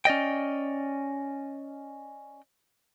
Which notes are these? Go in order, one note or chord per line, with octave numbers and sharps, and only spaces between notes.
C#4 D5 D#5 G5